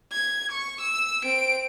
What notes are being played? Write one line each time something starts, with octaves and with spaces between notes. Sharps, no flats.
G#6
C#6
E6
C4 D7